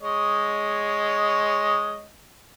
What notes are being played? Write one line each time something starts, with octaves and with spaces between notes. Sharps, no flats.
G#3 C#5 D#5